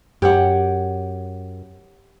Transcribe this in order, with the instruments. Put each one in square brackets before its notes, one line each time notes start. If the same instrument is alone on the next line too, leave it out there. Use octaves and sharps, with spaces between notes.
[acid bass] F#2 [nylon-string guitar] G4 C#5 F#5